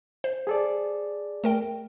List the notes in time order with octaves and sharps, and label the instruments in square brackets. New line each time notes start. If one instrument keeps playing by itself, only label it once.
[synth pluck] C5
[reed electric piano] G#4 A4 D5
[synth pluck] A3 A#4 G5